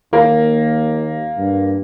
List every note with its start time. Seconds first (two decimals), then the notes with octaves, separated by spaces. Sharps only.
0.13 D#2 A#3
1.38 G2